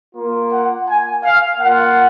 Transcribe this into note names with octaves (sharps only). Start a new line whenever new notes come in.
A#3 F4
F#5
G#5
F5
A#3 F4 F#5